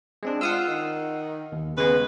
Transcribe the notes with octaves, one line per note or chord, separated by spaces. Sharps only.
G#3 C4 D4
F4 F#5 D#6 E6
D#3
D#2
C#3 G#3 B3 B4